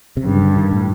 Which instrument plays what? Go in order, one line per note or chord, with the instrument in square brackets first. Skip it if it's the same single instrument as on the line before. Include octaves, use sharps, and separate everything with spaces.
[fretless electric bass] C3
[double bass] G2 [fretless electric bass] C#3
[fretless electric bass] D3
D#3
A2